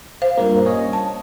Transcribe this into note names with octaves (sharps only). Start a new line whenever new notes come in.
C5 F5
G2 A#2 A#3
C#4 C#5 D#5
A5